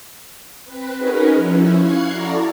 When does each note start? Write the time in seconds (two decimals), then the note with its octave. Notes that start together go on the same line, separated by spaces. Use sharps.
0.65 C4 B4
0.96 C#4 D#4 F#4 G#4 A#4 B4
1.33 F3 C#4 E4
1.76 F5 C#6 F#6 G#6 C7
2.08 E4 F#4 A4 D5 A#5